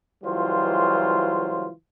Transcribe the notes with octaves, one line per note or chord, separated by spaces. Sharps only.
C#2 E3 F#3 G3 F4 C5